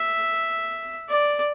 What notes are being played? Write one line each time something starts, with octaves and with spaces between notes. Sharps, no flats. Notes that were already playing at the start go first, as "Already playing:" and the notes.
Already playing: E5
D5